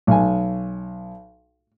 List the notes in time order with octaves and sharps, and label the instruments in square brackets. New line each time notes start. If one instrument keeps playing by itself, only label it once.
[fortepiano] B1 G#5